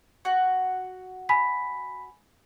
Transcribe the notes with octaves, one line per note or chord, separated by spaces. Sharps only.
F#4
G#5 B5 B6